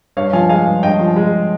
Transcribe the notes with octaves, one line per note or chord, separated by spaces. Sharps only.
G2 C#5 F5
F3 F5 G#5
G#3 F5 G#5
G2
G2 D#5 G5
F3
G#3